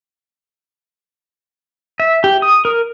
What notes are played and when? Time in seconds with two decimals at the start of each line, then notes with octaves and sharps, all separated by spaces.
2.00 E5
2.24 G4
2.42 D#6
2.65 A#4